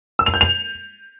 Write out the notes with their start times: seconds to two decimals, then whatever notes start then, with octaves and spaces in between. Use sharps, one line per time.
0.19 E6
0.26 F7
0.34 G6
0.41 F7